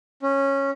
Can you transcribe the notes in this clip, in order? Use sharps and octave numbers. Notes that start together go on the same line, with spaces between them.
C#4